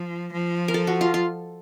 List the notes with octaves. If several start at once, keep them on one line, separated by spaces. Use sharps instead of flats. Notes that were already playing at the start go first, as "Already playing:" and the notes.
Already playing: F3
F3
A#4
A4
F#4
F4
F4